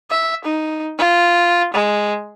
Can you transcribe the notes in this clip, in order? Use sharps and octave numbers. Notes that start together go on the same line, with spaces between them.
E5
D#4
F4
G#3